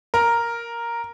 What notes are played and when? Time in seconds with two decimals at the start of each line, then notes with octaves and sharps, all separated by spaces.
0.14 A#4